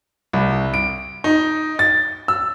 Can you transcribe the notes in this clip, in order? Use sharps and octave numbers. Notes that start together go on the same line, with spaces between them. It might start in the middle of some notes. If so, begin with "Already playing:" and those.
C2
D7
D#4
A6
E6